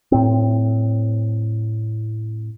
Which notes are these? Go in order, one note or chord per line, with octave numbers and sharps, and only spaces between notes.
A2 C4